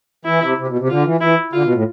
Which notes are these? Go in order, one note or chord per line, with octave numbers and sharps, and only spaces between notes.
E3 E4
C3
C3
B2
C3
D3 F4
E3
E3 E4
D3 F4
B2
A2